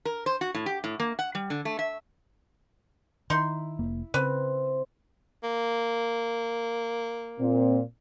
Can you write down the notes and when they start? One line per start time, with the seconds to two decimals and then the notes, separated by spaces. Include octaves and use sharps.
0.05 A#4
0.26 C5
0.41 F#4
0.55 A2
0.66 G4
0.84 A2
1.00 A#3
1.19 F#5
1.35 G3
1.50 D3
1.65 A3
1.79 E5
3.30 D#3 D#4 E4 C6
3.79 F1 A#3
4.14 C#3 C4 B4
5.43 A#3
7.40 A#2 C4